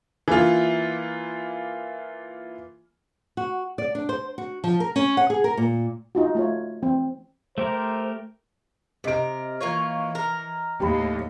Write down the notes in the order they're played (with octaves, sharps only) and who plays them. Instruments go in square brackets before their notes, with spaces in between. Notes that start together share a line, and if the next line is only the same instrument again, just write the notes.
[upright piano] E3 A#3 F4
[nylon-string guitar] F#4
D5
D4
C5
F#4
F3
A#4
C#4
F#5
G#4
A#4
A#2
[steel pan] D#4 F4 F#4
A3 F4 C#5
E3 C4
[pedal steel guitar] A3 G4 A#4 [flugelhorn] C5
[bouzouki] C3 A#4 [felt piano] D#5 D7
[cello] E3 [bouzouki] A#3 F4 C#5
[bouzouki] A#4
[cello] D#2 A2 [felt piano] G4 B5